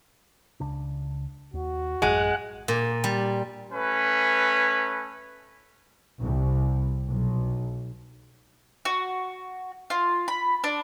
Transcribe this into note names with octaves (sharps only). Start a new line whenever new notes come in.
C#2 C#3 D4
D#2 F#4
A1 F#2 G#3 F#5
A#2
G3
A3 C#4 B4
C2
B1
F#4
F4
B5
D4